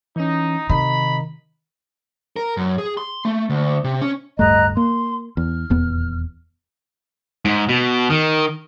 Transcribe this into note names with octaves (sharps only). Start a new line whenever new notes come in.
E3 C#4 D#4
C3 D#3 D#5 A#5 B5
A#4
F#2
G#4
C6
A3
D2
C3
C#4
D1 G2 A3 D#5 A#5 F#6
A#3 C6
E2 F6
D#1 E2 B3
G#2
B2
D#3